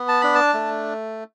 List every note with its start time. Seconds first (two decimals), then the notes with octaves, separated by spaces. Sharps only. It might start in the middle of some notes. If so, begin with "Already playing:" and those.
Already playing: B3
0.08 A5
0.21 D4 B5
0.35 A5
0.54 A3